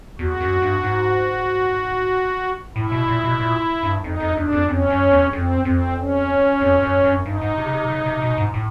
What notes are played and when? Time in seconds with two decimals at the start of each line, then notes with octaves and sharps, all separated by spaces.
0.18 E2 F#4
0.41 F#2
0.62 G2
0.83 G#2
2.76 A2 E4
2.92 B2
3.08 A#2
3.24 B2
3.40 A#2
3.83 G2
4.04 F2 D#4
4.20 F2
4.36 E2 D4
4.52 F2
4.68 F2 C#4
4.90 F#2
5.11 E2
5.33 F2 C4
5.65 F2 C4
5.97 C#4
6.61 F2
6.82 F#2
7.04 F#2
7.25 G2 D#4
7.41 G#2
7.58 C3
7.66 C#3
7.73 C3
7.90 C#3
8.06 C3
8.22 B2
8.38 G#2
8.54 A2